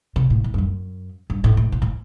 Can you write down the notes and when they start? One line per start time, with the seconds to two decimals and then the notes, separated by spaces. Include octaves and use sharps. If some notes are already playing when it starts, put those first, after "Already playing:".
0.16 C3
0.30 A2
0.44 A2
0.54 G2
0.58 F#2
1.30 G2
1.44 A2
1.57 A2
1.72 A#2
1.82 A2